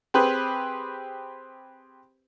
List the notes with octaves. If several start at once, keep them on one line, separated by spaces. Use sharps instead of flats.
C4 G4 G#4 B4